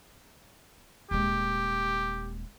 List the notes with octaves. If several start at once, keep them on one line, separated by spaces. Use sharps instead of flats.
D#1 G#3 G4